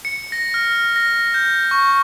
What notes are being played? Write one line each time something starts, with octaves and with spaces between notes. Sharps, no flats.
C#7
A#6
F6
A#6
G6
C#6